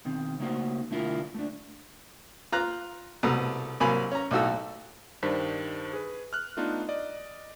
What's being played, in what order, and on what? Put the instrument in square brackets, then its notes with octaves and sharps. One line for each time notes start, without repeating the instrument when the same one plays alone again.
[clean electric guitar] B2 D#3 C4
C#3 A3 A#3 D#4 F#4 C5
B2 D3 A3 E4 F4 A#4
A3 D4
[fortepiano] F4 A#5 F#6
C2 B2 A3 B3 A#5
C2 F#3 A#3 F5 G#5 B5
C#4 A#5
B1 A2 D#4 F#4 A4 E6
[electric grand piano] G2 D#3 D4 C5 B6
G#4 B4
F6 F#6
A3 B3 D4 D#4 F4
D5 D#5